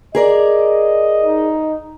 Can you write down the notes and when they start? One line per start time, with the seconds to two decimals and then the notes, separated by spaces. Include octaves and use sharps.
0.15 G#4 A#4 D5 D#5
1.24 D#4